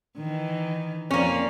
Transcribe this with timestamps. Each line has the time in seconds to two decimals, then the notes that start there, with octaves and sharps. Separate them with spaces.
0.17 D#3 E3
1.11 F2 F3 A#3 C#4 D5